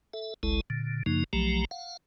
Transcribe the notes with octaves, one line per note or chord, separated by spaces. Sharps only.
A4 E5
G1 C#2 G#3 E4 A4 A5
A#2 D3
F#2 C#3 F3 A#3 D#4
B1 F3 F#3 A3 G4 A#5
F5 F#5